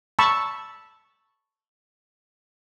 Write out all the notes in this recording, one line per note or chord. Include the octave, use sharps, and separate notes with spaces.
A5 B5 C#6 E6